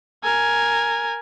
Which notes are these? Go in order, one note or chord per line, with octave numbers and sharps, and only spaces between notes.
A#4 G#5